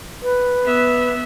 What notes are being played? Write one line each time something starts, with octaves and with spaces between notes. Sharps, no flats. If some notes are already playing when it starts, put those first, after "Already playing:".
B4
B3 E5